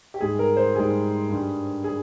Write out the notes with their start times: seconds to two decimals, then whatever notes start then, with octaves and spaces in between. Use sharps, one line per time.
0.14 G4
0.20 G#2 G3 G#4
0.39 A#4
0.57 C5
0.75 G#2 G3 G#4
1.29 G2 G3
1.84 G3 G#4